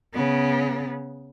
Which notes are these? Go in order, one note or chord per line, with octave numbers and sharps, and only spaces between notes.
C#3 B3